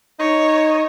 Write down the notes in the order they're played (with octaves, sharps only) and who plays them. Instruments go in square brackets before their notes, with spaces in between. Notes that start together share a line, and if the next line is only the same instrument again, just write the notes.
[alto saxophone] D#4 [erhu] C#5